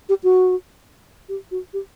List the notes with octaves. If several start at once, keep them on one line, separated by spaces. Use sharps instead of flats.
G4
F#4
G4
F#4
G4